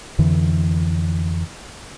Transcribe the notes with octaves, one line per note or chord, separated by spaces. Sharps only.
F2 D3 E3